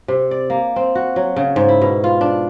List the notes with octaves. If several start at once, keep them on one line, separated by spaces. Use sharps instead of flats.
C3
D5
A#3
C4
F#4
F#3
C#3
G#2
E4
B2
F4
D4